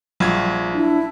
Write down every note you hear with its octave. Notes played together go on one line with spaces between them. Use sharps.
A#1 F#3 G3 F4 G#6
D4 E4